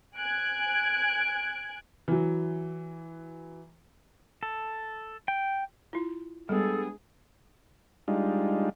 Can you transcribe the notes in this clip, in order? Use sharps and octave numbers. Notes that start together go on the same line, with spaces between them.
G#5 F#6 G#6 D7
E3 F#3
A4
G5
E4 F4
G3 G#3 B3 D4 G#4 A4
G3 G#3 D4 D#4 F4